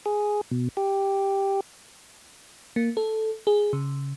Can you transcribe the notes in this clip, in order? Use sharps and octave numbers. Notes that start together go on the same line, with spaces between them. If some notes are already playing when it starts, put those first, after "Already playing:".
G#4
B2
G4
A#3
A4
G#4
C#3